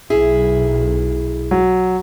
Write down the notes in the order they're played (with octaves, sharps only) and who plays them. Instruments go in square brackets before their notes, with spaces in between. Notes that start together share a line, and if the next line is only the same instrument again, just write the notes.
[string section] B1 [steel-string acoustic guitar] E4 G#4
[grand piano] F#3